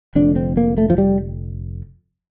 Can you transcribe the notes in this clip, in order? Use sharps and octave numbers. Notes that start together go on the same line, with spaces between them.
F1 F2 D3 D4
C4
A#3
A3
F3
G3